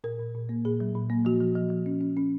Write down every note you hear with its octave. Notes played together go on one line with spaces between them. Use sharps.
A#2 A#4
A#2
A#2
A#3
A#2 G#4
F#3
A#2
A#3
F3 F#4
F3
F3
F3
C#4
C#4
C#4